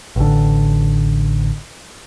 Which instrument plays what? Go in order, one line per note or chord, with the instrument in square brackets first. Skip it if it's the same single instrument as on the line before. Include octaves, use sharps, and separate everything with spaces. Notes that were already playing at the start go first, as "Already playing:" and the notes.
[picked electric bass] A1 D3